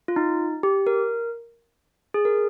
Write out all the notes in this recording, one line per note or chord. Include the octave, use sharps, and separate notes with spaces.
F4
D#4
G4
A#4
G#4
A#4